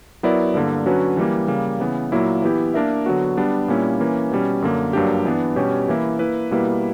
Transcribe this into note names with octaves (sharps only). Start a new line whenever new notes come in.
F#3 B3 E4 A#4 D5
G2 D3 A#3
D3 F#3 C#4 F#4 B4
E3 G3 A#3
C#3 G3 A#3
C#3 E3 B3
A#2 F#3 A#3 E4
E3 B3 E4 G4
A#3 D4 A#4 E5
D3 F#3 B3 F#4
G3 B3 D4
A#2 G3 A#3 C#4 E4
E3 A#3 C#4
B2 G3 C#4
F#2 D3 A#3
G2 F#3 A#3 D4 G4
E3 B3 D4
B2 G3 C#4 G4 C#5
E3 A#3 E4
A#3 E4 B4
B2 G3 A#3 E4 B4